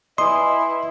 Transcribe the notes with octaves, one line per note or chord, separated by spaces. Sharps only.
E4 B4 D#5 G#5 B5 C6